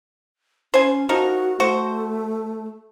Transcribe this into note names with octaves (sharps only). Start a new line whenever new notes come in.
C#4 C5 G#5
F3 D#4 F#4 A#4
A3 F#4 C5